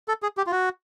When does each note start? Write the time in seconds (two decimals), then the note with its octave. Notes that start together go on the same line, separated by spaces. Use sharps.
0.08 A4
0.23 G#4
0.37 G4
0.47 F4
0.52 F#4